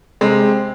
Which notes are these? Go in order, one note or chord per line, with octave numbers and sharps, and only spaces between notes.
C3 G#3 C4